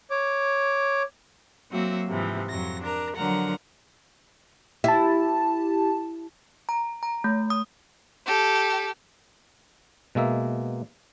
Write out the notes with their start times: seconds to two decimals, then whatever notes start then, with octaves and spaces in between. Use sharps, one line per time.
0.10 C#5 D6
1.70 F#3 A#3 C4 F#4 E5
2.07 G#2 C3 E3 F3
2.48 F2 F#3 A#6
2.82 D4 A#4 A#5
3.15 D3 F3 F#3 A#4 F#5 A#5
4.84 E4 G4 A5
6.69 A#5
7.03 A#5
7.24 A3
7.50 D#6
8.27 G4 A4
10.15 B2 G#3 A#3 E5